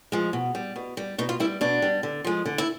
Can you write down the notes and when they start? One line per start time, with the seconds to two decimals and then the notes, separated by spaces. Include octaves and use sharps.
0.12 F3 G#3
0.33 B2
0.55 G3
0.76 B2
0.97 G3
1.18 B2 D#4
1.29 F4
1.40 G3 E4
1.61 B2 D4
1.82 G3
2.03 D3
2.25 F3 G#3
2.46 D3
2.58 E4